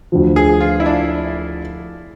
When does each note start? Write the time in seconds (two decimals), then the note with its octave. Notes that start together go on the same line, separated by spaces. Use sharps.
0.12 D2 D3 F3
0.36 G#4
0.61 F4
0.80 E4
0.86 D4